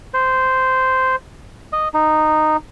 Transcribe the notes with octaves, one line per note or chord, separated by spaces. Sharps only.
C5
D#5
D#4